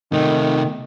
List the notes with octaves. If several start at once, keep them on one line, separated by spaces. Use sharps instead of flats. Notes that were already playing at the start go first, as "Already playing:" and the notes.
C3 D#3 A3